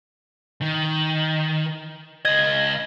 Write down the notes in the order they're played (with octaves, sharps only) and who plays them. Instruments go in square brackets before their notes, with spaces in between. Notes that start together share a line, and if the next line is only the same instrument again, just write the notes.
[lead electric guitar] D#3
[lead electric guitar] C#2 D#5 [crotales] G#6